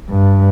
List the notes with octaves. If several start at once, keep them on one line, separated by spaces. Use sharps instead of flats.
G2